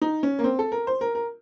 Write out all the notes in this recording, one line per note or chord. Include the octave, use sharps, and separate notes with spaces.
D#4
C#4
A#3
C4
A4
A#4
C5
A#4
A#4